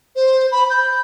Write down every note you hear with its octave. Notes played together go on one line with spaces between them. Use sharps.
C5
B5
G6